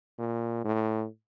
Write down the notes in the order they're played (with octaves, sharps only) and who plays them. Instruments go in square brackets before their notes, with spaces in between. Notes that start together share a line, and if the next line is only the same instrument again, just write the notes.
[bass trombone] A#2
A2